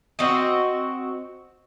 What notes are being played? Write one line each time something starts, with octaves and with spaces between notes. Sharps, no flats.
C4 F#4 D#5